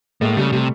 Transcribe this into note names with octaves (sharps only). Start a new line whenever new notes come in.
A2 G#3 A#3
C#3 G3 A3
C3 G3 A3